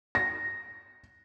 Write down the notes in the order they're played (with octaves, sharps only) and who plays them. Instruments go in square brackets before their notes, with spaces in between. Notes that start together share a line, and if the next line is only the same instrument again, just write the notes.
[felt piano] A#6